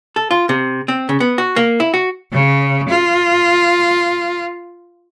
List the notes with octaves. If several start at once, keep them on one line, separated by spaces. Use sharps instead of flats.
A4
F4
C3
C4
C#3
B3
F#4
A#3
E4
F#4
C#3
F4